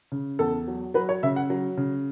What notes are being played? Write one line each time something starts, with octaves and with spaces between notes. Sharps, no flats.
C#3
E2 A4
F#3
F#3 B4
C#5
C#3 E5
F#5
F#3
C#3